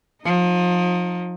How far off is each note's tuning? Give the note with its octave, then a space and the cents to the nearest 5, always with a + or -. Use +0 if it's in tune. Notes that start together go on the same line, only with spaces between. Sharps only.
F3 +30 D#4 +0